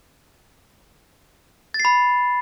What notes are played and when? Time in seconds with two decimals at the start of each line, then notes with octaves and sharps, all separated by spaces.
1.74 A6
1.80 C7
1.85 B5